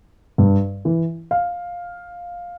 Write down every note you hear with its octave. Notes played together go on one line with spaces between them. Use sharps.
G2
E3
F5